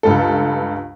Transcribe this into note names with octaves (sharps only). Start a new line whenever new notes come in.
C#2 G2 A4